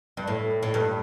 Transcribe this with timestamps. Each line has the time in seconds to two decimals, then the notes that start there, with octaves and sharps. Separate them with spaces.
0.17 G2
0.28 A2
0.63 A2
0.74 G2